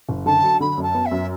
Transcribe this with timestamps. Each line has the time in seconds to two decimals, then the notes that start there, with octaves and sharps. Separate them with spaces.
0.09 F#1
0.26 D3 A5
0.43 F#3
0.61 D3 B5
0.78 F#2
0.83 A5
0.95 B3
1.06 E5
1.11 F#2